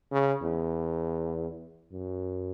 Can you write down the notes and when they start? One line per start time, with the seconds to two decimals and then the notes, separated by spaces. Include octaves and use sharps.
0.12 C#3
0.42 E2
1.92 F#2